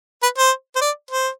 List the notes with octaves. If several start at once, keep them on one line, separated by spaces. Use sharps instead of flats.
B4
C5
C5
D5
C5